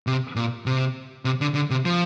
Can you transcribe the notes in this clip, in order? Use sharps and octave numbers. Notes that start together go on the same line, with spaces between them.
C3
A#2
C3
C3
D3
D3
C3
F3